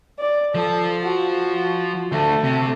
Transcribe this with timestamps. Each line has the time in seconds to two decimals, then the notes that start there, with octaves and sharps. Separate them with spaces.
0.19 D5
0.55 F3 A4
1.03 F#4
2.12 D2 A3
2.44 C3